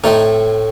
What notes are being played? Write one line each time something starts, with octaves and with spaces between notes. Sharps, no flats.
A2 A3 C4 D#4